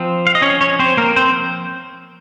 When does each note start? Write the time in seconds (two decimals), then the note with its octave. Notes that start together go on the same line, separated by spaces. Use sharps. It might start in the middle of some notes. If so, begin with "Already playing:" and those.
Already playing: F3 C4
0.27 F5
0.35 D#5
0.42 C#4 C#5
0.61 C#4 C#5
0.79 C4 C5
0.97 A#3 A#4
1.16 C4 C5